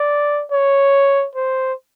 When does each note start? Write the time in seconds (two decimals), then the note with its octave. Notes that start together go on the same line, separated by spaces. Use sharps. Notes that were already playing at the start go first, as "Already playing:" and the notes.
Already playing: D5
0.52 C#5
1.35 C5